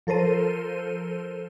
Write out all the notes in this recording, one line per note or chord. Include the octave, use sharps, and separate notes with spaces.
F3 A4 A#4 C5 D#7